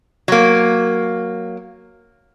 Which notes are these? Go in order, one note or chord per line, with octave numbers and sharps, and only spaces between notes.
F#3 A#3